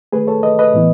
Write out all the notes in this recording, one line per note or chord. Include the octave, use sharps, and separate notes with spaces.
D#3 A3 G#4 B4
A4 C#5
B4 D#5
B4 D#5
A2 E3 B3